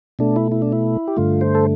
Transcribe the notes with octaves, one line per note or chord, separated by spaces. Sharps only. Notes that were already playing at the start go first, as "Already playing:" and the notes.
B2 A3 D4
E4
E4
D4
E4
G4
G2 D3 A3 F4
C5
A4